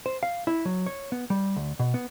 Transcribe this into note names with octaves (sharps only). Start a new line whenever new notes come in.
C5
F5
E4
F#3
C#5
B3
G3
D2
B2
B3